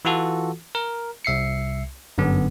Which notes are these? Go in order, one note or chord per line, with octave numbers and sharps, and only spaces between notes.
E3 F4 F#4 A4
A#4
C2 E5 C7 C#7
G1 F#2 D3 B3